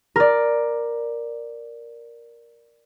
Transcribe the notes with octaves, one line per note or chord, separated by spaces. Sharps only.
A#4 D5